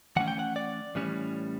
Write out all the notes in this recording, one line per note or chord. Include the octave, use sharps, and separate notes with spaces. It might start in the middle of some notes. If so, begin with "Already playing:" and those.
E3 A3 C#4 F#5
G5
F#5
D5
A2 E3 G3 C#4